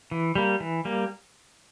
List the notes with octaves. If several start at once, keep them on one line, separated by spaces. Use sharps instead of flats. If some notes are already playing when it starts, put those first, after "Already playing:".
E3
G3 A#3
E3
G3 A#3